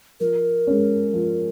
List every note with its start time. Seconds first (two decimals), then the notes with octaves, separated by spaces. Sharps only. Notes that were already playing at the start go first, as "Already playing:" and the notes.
0.20 F3 A#4
0.67 G#3 C#4
1.14 F3